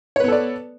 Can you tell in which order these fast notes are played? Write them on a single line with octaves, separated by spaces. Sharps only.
C#5 B4 B3 A4 D5